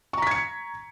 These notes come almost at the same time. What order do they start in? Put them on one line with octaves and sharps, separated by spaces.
C#6 A#5 B6 G#6 C#7